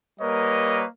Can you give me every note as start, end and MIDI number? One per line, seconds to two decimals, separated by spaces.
0.20 0.86 55
0.20 0.86 58
0.20 0.86 70
0.20 0.86 71
0.20 0.86 73
0.20 0.86 75